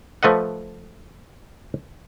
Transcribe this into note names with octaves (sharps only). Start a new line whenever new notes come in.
F3 A3 B4 D#5 F#5